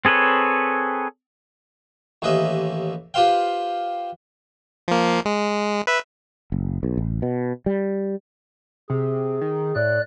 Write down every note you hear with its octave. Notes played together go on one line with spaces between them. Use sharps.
C4 G#4 A4 B4 C#5
A1 D#2 G#4 B4 D#5 E5
F4 G4 B4 C5 F5 G5
F3 A#3
G#3
B4 E5
F#1
B1
A1
B2
G3
C3 G#4
D#3
A2 D5 F#6